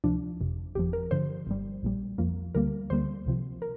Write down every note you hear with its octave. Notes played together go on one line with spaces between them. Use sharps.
D2 C3 F3 D4
G1 F2 C3
G1 F2 F3 G4
A#4
G2 D3 F3 C5
G1 G2 G3
A#1 A#2 G3
F2 F3 A#3
D2 D3 G3 A#3 A#4
D2 D3 G3 A#3 C5
C2 C3 F3
A#4